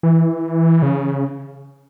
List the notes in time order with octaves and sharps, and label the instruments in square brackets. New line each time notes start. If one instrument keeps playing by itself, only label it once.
[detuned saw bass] E3
C#3